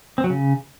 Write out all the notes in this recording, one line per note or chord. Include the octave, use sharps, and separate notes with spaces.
C4
F#3
C#3